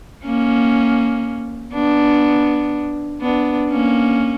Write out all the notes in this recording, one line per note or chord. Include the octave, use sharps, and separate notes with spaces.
A#3 C#4
B3 D4
B3 D4
A#3 C#4